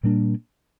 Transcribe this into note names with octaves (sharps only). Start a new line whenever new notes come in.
A#2 G3 A#3 D4